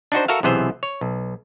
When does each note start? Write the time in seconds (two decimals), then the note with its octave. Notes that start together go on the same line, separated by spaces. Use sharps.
0.12 D4 D#4 F#4 C5
0.28 F#4 A4 A#4 E5 F5
0.43 B1 C3 E3 B3 G#4 C5
0.83 C#5
1.01 B1